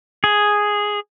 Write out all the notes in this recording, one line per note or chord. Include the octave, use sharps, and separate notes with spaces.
G#4